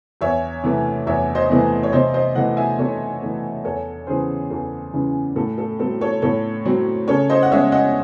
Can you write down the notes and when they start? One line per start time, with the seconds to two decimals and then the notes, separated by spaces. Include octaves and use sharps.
0.21 E2 C#5 E5
0.64 C3 E3 A3
1.07 E2 C#5 E5
1.35 C5 D#5
1.50 C3 E3 A3
1.83 C#5
1.92 C3 C5 D#5
2.14 C5 D#5
2.35 E3 A3 D#5 F#5
2.57 E5 G#5
2.78 C3 A4 C#5
3.22 E3 A3
3.65 E2 A4 C#5
4.07 C#3 E3 G#4 C5
4.50 E2 A4
4.94 C#3 E3
5.36 A2 A4
5.58 A4
5.79 F#3 C4 A4
6.01 A4 C#5
6.22 A2 A4 C#5
6.65 F#3 C4
7.08 C#3 A4 C#5
7.30 C5 D#5
7.43 F#5
7.52 G#3 C#4 C#5 E5
7.72 D#5 F#5